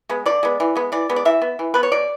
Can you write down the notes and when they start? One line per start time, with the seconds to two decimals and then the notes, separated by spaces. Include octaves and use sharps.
0.09 G#3 B3
0.26 D3 D5
0.43 G#3 B3
0.60 E3
0.75 G#3 B3
0.92 E3 D5
1.09 G#3 B3
1.16 D5
1.25 E3 E5
1.42 B3
1.59 E3
1.74 B3 B4
1.83 C#5
1.92 B2 D5